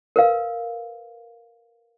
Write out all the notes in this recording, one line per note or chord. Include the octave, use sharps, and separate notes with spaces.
A#4 B4 F5